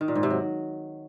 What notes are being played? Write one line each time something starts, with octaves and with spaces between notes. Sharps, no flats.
D#3
A#2
G#2
C3
F#3